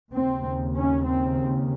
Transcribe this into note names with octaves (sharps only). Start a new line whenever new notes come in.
D#2 C#3 C4
C#4
C4